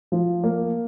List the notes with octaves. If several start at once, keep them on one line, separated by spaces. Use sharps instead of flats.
F3
A#3